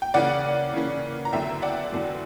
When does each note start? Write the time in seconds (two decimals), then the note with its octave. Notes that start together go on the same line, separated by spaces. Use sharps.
0.02 G5
0.14 C#3 E3 A#3 C#4 D5 F#5
0.74 C#3 E3 A#3 C#4
1.25 A#5
1.33 E2 D3 F#3 E5 G5
1.62 D5 F#5
1.92 E2 D3 F#3